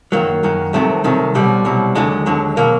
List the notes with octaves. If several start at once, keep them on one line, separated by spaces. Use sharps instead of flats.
F#2 D#3 F#3 A#3
F#2 D#3 F#3
C2 C3 D#3 F#3 A3
C2 C3 D#3 F#3
C2 B2 F#3 G3
C2 B2 F#3
D#2 D3 F#3 G#3
D#2 D3 F#3
B2 F#3 A#3